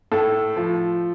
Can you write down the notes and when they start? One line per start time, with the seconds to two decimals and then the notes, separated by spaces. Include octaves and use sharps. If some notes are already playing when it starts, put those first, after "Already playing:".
0.12 A2 A4
0.56 F3